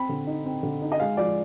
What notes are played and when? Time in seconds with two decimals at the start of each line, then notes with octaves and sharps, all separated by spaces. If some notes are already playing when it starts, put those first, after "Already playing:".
Already playing: C4 B5
0.09 D3
0.27 D#4
0.45 C4
0.63 D3
0.81 D#4
0.92 D#5
1.00 G#3 F5
1.17 F3 D5